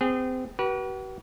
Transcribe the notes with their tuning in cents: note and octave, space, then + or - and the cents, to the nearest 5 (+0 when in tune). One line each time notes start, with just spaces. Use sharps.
C4 -35 G#4 -25
F#4 +45 B4 -35